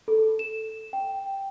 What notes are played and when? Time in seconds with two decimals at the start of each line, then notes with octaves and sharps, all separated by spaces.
0.08 A4
0.39 E7
0.93 G5